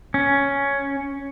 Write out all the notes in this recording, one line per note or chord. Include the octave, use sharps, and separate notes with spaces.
C#4